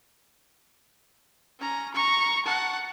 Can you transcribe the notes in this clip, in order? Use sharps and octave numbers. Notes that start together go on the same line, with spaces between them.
C#4 A#5
A#5 C#6
F#5 A5